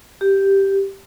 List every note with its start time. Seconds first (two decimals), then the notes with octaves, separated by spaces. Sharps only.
0.21 G4